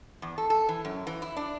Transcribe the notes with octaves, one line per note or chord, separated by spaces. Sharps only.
E2
A4
A4
E3
F#2
E3
E4
D4